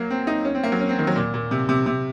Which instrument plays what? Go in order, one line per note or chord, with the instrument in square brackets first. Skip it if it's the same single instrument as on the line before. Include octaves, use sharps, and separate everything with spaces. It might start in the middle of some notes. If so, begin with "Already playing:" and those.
Already playing: [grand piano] F#3 A#3
C4
D#4
C#4
C4
A#3
F#3
C#4
C4
D#3
F#3
A#2
A#2
C3
C3
C3